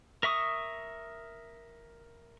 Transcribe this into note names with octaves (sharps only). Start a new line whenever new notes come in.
A#4 E5 C#6 D#6